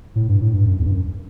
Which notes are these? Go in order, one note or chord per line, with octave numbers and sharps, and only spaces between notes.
A2
G2
A2
G2
F#2
E2
G2
F#2